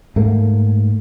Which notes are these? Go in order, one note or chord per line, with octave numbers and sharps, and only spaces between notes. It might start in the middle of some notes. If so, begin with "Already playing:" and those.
G#2 A3 A#3